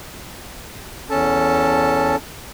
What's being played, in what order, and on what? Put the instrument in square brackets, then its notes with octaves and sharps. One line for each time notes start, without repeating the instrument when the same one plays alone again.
[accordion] E2 C#4 A4 A5